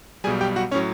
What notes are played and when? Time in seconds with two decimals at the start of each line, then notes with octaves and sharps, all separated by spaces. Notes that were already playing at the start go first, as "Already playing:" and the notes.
0.24 B1 B2 G3 G#4 G#5
0.41 G4 G5
0.56 F#4 F#5
0.71 A2 F#3 C#4 C#5